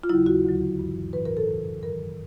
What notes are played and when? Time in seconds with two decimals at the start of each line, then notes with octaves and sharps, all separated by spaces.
0.04 F4
0.09 D#2 C#3 F#3 E4
0.26 F#4
0.44 D2 D3 F#3
0.79 G2 E3
1.13 A2 E3 B4
1.25 A#4
1.37 A4
1.48 F#2 C#3 E3
1.82 G2 D#3 F#3 A#4